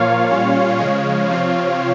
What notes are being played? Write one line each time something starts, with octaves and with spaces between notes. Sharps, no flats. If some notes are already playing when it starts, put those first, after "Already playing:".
Already playing: A#2 F3 A#3 F4 C#5 F5
A#2 G3 C#4 F4
C#3 F3 G#3 C#5 F5
C3 F3 C4 F4